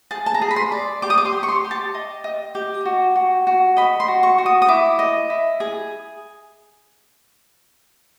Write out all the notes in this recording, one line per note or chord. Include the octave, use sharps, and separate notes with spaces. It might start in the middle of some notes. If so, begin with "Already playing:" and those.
G#4 A5
A5
A#5
G#4
B5
C6
D5
G4 D6
D#6
D6
C6
G4
C#6
C6
G4
A5
D#5
D#5
G4
F#4
F#4
F#4
D#5 B5
C6
F#4
C#6
F#4
D#6
D#6
E4 D6
D#5
E4
G#4